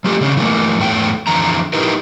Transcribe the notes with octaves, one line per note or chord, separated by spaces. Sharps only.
F3 A3 G4 A4
C#3 C#4 D4
E3 A3 A#3
E2 G#2 A3 G5
F2 D3 E3 A#5
D#4 E4 G4 A#4 B4